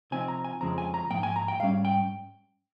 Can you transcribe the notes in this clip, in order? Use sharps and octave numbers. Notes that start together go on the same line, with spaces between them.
C3 F3 C4 D#4 G#5
A#5
G#5
F2 C#3 F3 G#3 C4 A#5
G#5
A#5
G#2 F3 A#3 G5
G#5
A#5
G5
G#2 G3 C#4 F5
G5